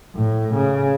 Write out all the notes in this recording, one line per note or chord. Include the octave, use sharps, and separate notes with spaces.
A2
C#3